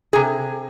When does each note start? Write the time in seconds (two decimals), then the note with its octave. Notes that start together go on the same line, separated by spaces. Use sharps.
0.13 C3 G#4